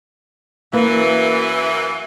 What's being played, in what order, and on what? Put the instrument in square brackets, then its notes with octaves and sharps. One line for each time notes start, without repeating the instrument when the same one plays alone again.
[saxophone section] F#2 E3 [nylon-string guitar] A#3 B4